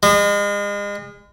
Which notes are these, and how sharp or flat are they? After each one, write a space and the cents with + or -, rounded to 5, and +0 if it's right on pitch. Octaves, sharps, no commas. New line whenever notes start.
G#3 -35